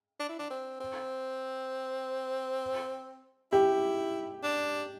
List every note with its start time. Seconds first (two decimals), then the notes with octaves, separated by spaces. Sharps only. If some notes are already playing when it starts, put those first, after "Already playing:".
0.20 D4
0.29 E4
0.39 D4
0.50 C4
0.80 C4
3.52 E4 G4
4.43 D4